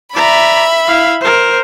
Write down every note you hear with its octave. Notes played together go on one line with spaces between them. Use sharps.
D5 E5 A#5 B5
E4 F5
A#4 C5